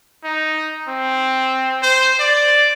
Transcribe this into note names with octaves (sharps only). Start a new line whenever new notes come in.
D#4
C4
C5
D5